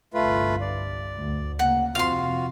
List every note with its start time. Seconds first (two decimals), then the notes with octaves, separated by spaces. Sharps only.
0.14 G1 C2 G2 A3 F4 B4
0.61 D5
1.17 D2
1.59 C#3 A#3 F#5
1.95 F2 C3 C4 F4 F#4 F5 C6